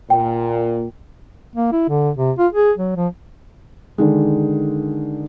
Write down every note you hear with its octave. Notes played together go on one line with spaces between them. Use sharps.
A#2 G5
A#3
E4
D3
C3
F4
G#4
F#3
F3
D3 D#3 G#3